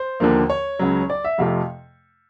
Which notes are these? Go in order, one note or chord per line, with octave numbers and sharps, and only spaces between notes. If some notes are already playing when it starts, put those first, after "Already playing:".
Already playing: C5
D#2 D3 F3 A#3
C#5
C#2 C#3 F#3
D5
E5
F2 C3 F3 A3 F5